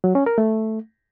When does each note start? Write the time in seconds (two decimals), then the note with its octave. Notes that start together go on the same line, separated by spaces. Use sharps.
0.04 F#3
0.15 C#4
0.26 A#4
0.38 A3